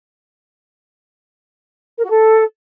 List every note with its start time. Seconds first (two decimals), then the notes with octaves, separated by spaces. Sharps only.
1.98 A#4
2.04 F#4
2.09 A4